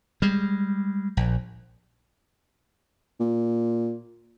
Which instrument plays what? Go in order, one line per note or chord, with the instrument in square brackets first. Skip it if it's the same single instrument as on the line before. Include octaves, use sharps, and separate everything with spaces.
[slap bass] G3 G#3
A#1
[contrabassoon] A#2